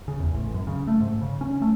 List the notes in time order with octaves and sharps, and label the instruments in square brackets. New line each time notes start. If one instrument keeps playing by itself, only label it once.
[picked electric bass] C#3
E2
A1
F#2
C#3
A3
G#2
C#3
C#4
A3